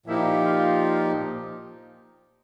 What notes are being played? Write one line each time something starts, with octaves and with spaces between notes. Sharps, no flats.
A#2 F3 A#3 D#4 E4 G4
F4